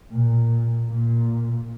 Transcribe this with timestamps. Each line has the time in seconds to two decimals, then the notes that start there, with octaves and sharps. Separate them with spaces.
0.12 A#2
0.89 A#2